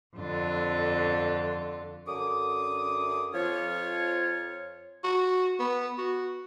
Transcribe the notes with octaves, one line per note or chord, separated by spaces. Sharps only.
F2 D3 F4
F#2 D3 D6 D#6
F2 F3 F4 C#5
F#4
B3
F#4